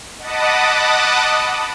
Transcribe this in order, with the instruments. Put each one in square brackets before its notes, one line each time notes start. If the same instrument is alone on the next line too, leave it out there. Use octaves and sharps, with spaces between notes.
[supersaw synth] D#5 F#5 A5 B5 D6 D#6